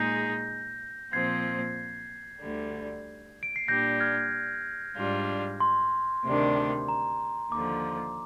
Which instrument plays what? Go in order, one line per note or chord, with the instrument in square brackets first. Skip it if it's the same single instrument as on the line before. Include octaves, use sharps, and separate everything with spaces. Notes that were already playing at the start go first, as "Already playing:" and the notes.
Already playing: [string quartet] A#2 G#3 D#4 G#4 [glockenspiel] G6 A#6
[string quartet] A#2 F3 C4 [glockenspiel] G#6 C7
[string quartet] D2 D3 G3
[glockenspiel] D7
C7
[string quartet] A#2 G3 D4 [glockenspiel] G6 A#6
[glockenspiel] F6 G#6
[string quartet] G#2 G3 D4 F4
[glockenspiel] C6
[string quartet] D2 C3 D#3 G3 D4
[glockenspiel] A#5
[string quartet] D#2 D3 F3 [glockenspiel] D6